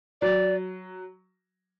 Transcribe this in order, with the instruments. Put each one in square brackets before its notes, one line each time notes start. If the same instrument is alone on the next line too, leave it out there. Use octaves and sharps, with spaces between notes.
[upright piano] F#3 [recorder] D5